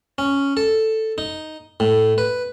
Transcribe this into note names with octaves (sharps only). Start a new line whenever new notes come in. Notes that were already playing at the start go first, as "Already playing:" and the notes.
C#4
A4
D#4
A2
B4